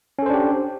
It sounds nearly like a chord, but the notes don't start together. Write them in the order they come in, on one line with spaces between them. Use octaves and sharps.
C#4 A4 C5 D4 G4